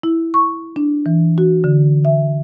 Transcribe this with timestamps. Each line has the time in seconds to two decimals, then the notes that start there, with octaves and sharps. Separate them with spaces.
0.03 E4
0.34 C#6
0.76 D4
1.06 E3
1.38 F#4
1.64 D3
2.05 E5